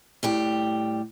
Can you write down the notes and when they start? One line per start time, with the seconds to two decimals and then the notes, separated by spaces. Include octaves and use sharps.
0.23 A2 G3 G4